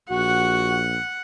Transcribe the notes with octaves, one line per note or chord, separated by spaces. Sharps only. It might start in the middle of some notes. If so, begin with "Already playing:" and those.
A#1 F#4 F#5